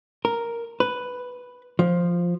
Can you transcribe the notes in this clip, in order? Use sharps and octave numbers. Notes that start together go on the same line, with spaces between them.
A#4
B4
F3